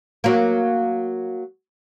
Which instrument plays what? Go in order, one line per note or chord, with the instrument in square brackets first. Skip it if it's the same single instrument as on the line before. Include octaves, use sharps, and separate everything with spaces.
[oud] F#3 A#3